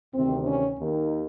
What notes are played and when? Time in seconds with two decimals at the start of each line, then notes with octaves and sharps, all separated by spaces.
0.14 D2 C3 D#3 C4
0.47 C#4
0.78 D#2 D#3